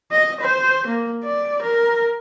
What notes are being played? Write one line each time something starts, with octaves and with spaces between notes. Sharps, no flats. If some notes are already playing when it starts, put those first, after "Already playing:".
D#5
C5
A#3
D5
A#4